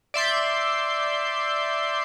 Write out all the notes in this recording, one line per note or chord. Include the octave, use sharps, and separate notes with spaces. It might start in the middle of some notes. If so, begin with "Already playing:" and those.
D5 E5 C6 G6